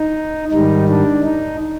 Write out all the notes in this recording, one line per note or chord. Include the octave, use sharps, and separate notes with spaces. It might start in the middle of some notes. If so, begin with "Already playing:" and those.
Already playing: D#4
G#2 D#3 G3 D#4
D4
D#4